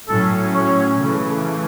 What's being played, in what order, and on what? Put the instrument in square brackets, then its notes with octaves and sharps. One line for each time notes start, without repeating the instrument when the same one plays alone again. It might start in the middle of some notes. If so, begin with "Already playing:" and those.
[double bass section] A2 F#3 C#4 [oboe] A4
[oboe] C#5
[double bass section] C#3 E3 A3